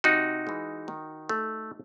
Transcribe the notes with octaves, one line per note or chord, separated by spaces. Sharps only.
C3 D#4 F#4
E3 G#3
D#3
A3